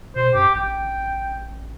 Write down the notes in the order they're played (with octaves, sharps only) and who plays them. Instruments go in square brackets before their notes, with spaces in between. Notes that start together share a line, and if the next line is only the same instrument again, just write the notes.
[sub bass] B2 [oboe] C5
[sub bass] F#2 [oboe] G4
[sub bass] A1 [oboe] G5